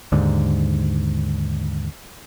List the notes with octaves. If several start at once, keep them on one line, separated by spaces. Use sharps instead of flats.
D#2 G#2 D3